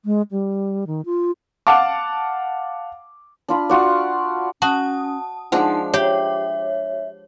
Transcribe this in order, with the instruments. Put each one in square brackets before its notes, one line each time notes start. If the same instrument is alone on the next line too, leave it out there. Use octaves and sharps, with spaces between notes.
[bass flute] G#3
G3
D#3
F4
[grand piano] F5 F#5 A5 D6
[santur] D4 F4 B5
F4 F#4 D5
[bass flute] C#4 [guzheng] F#4 [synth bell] A5 D#6
[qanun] F3 G#3 D4 [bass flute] D#4 [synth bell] F#5
[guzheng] G4 [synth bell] C#5 [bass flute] E5